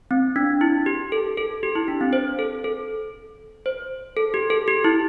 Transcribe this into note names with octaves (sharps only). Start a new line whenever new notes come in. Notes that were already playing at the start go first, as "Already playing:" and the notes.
C4
D4
E4
G4
A4
A4
G4
E4
D4
C4
C5
A4
A4
C5
A4
G4
A4
G4
E4